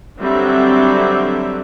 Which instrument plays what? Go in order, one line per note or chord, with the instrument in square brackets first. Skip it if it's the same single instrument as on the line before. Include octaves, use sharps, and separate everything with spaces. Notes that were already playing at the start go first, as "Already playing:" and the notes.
[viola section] D3 F#3 G3 C4 E5